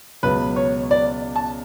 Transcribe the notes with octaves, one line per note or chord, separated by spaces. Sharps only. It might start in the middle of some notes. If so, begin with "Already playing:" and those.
C#2 B2 F#3 B4
C#5
D5
A5